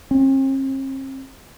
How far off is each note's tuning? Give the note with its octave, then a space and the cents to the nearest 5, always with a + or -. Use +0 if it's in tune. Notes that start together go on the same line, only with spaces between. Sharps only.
C4 +45